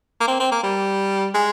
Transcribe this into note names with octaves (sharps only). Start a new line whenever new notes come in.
A#3
C4
C4
A#3
G3
G#3